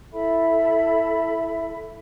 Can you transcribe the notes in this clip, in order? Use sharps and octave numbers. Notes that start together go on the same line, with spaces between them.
E4 A4 E5 B5